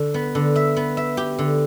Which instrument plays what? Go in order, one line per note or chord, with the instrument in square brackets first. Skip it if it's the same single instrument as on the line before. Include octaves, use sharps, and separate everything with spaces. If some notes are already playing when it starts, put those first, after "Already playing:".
Already playing: [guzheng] D3
B3
D3
E5
B3
E5
G4
D3